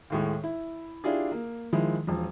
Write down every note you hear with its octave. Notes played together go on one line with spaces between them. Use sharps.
D#2 A2 G#3
E4
D4 E4 F4 G4 G#4
A#3
D#3 F3 G#3 E4
E1 F3